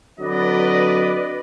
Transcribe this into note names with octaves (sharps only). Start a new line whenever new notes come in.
D3 F#3 C4 B4 D5 D#5